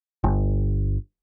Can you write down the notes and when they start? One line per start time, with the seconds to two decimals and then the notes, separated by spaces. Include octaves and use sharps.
0.24 G1